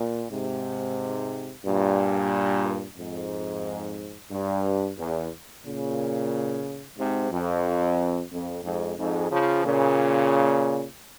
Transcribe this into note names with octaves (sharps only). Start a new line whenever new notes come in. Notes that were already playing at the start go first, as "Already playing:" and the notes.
Already playing: A#2
G#2 C3
G2 A#2
F2 G#2
G2
E2
A#2 C#3
G#2 C3
F2
F2
F2 G#2
F2 G#2
C#3 F3
A#2 C#3